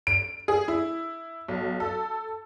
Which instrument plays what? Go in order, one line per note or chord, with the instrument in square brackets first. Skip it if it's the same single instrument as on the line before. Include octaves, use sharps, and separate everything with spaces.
[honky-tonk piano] D7
G#4
E4
B1
A4